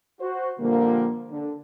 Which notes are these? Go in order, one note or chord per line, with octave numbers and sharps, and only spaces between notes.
F#4 C5
A#2 D3 F3 G3 A#3
D3